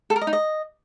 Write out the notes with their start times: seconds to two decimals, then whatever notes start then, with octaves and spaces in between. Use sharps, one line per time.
0.10 A4
0.16 A#4
0.21 D#5
0.27 D#4
0.33 D#5